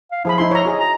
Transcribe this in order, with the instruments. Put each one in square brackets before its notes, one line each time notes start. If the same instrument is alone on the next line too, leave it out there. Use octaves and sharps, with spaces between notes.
[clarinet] F5
[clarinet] F3 [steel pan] E4 G#4 B5
[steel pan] D#4 E4 C6
C#5 E5 A#5
F#4 G#4 D#5
[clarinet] A#5